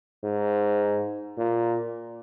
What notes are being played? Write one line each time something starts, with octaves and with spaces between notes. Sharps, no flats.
G#2
A#2